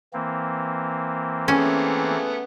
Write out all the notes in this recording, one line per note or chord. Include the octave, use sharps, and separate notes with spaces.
E3 A#3 C4
A3 B3 C#4 G#4